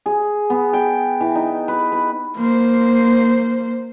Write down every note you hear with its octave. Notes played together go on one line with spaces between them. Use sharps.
G#4
B3
G5
E3
D#4
B4
B4
A#3 C5